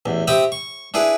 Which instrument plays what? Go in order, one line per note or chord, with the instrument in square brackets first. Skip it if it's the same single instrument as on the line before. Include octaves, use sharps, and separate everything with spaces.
[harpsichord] A1 E2
C4 G4 E5 B5 D#6
C#6
D4 E4 G#4 B4